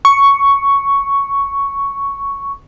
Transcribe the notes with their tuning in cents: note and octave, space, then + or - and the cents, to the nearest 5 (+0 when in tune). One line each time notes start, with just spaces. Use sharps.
C#6 +5